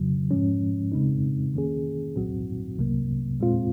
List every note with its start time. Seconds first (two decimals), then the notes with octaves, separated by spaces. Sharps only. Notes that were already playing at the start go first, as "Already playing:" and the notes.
Already playing: F2 C#3 F#3
0.31 G#2 F3 G#3 C#4
0.92 C#3 G#3 C4 D#4
1.54 D#3 A#3 C#4 G#4
2.16 C2 A#2 F#3 C4 F#4
2.78 C2 C3 F#3 A#3
3.40 A#2 G#3 C4 F4